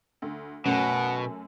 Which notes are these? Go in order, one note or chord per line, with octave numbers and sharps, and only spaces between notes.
D2
F#2 B2 A3 C#4 F#5